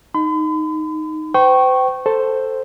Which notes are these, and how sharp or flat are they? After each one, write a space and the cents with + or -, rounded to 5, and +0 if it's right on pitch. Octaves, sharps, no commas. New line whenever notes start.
D#4 +0 B5 +45
C5 -40 G5 -25 C#6 -15
A4 +5 C5 +0